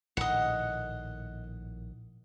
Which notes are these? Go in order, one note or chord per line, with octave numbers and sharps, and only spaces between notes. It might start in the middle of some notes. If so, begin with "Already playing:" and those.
A#1 A2 D#3 D#5 F#5